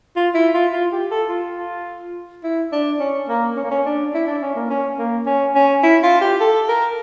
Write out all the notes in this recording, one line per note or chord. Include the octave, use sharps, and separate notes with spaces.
F4
E4
F4
F4
G4
A4
F4
E4
D4
C#4
A#3
C#4
A#3
C#4
D4
E4
D4
C#4
A#3
C#4
A#3
C#4
C#4
E4
F4
G4
A4
A#4